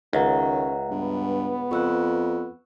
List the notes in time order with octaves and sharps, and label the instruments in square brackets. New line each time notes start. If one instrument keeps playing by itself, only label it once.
[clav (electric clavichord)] C#2 [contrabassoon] D#3 [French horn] C#4 [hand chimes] E5 F#5 A#5
[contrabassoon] G2 [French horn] B3
[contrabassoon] F2 [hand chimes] C#6 E6 F#6